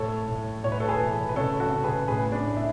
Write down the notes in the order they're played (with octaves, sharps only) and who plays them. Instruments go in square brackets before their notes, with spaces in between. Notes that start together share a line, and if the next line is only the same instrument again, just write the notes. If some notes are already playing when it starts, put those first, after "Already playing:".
Already playing: [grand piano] A2 A4 C#5
A2
A2 C#5
B4
A4
G#4 B4
E3
B4
C#3 A4 C#5
F#4 A4
C#3
G#4 B4
A2 G#4 B4
D4
A2
E4